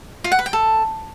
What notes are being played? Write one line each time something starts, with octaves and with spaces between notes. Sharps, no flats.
F4
F#5
B4
G5
A4